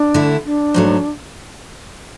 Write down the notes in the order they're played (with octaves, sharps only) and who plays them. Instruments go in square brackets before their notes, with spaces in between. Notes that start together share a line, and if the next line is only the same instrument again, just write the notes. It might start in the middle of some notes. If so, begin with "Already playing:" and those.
Already playing: [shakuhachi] D4
[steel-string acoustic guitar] D3 A3 E4
[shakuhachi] D4
[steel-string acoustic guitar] G#2 F#3 A3